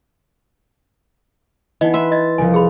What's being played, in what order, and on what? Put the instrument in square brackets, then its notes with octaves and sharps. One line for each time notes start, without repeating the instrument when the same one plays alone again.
[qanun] E3 [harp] B3 [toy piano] D#4 D#5
[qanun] B4 E5 [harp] C6
[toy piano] D#5 [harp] A6
[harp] C2 F3 [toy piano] G#5
[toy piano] G#4 B5